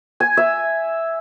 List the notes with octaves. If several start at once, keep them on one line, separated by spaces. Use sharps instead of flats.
G#5
E5